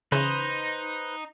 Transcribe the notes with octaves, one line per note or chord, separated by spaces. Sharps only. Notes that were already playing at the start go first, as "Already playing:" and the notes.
C#3 E3 D#4 B4 C5